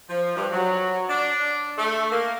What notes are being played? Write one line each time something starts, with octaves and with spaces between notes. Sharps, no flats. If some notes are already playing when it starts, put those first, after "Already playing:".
F3
G2
F#3
D4
A3
A#3